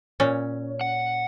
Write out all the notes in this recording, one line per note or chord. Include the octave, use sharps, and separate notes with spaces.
A#2 C#4
F#5